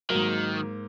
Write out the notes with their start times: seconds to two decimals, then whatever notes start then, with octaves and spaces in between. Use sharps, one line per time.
0.10 G#2 D#3 F#3 A#3